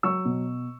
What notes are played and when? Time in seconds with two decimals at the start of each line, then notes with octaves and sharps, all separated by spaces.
0.03 F#3 C#6 E6
0.25 B2